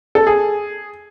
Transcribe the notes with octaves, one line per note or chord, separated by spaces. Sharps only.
A4
G#4